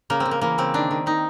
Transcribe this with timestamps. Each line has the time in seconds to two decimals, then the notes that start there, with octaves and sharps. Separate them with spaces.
0.10 C#3 A#3
0.20 C4
0.25 C#3
0.31 A#3
0.41 E3 A#3
0.58 C#3 C4
0.74 D#3 D4
0.91 D#3
1.06 D#3 D#4